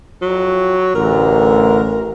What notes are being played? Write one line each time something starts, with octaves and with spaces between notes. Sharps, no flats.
F2 F#3
A1 D2 D3 A#4